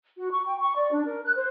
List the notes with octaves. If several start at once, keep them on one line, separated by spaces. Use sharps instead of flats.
F#4
C#6
G5
C#6
D5
D4
A#4
F#6
C5